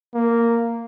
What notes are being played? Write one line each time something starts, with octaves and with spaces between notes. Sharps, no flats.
A#3